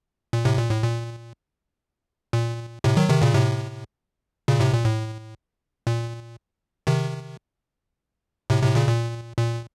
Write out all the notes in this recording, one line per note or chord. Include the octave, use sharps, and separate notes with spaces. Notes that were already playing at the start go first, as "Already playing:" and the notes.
A#2
A2 C3
A#2
A2
A#2
A#2
A2 C3
D#3 F#3
C3 D#3
A#2 C#3
A2 C3
A#2 C#3
A2 C3
A#2
A2
A#2
C3 D#3
A2 C3
A2 C3
A#2 C#3
A#2
A#2